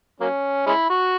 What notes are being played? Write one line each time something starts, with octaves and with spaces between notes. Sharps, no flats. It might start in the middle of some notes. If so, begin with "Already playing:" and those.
F#3 A#3 C#4
G#3 C#4 E4
F#4